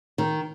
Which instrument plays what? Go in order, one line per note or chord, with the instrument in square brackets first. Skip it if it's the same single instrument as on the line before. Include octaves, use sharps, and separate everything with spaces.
[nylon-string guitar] D#3